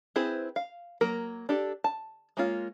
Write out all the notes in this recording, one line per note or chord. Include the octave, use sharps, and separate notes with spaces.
C4 E4 G#4 B4 C5
F5
F#3 A#3 A#4
D4 G4 A4
A5
G#3 A#3 C#4 F4